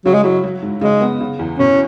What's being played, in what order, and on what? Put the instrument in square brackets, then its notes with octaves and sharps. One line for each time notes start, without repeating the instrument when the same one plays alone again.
[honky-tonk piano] C#3 [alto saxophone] F#3
[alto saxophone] G#3
[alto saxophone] F#3 [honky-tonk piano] E4
[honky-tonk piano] F#3
G#2
[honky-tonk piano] C#3 [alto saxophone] G#3
[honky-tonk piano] B3
C#3
E2
[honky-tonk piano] B2 [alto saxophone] C#4